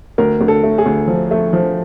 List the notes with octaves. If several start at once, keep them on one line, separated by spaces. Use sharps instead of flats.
D2 A#4
D2
A4
A3
G#4
D2
F3
A3
F3